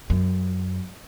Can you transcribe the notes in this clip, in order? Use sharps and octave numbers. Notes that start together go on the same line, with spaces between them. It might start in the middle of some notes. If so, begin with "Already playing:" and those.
F#2